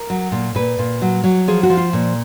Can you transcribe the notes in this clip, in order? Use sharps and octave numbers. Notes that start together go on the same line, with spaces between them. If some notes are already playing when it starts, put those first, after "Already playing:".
Already playing: A#4
F#3
A#2
A#2 B4
A#2
F#3
F#3
F3 G#4
F#4
F3
F4
A#2